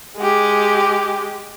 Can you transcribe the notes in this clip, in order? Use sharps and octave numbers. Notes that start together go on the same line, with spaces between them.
G#3 G4